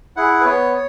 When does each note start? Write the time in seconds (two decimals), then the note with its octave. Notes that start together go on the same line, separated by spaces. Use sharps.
0.17 E4 G#4 F#5
0.41 B4
0.45 B3 C#5